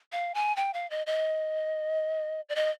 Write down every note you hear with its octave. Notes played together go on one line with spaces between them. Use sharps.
F5
G#5
G5
F5
D#5
D#5
D5
D#5